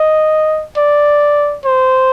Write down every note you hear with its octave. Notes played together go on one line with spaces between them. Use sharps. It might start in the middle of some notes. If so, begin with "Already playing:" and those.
Already playing: D#5
D5
C5